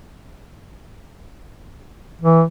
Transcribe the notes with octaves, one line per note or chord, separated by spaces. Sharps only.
E3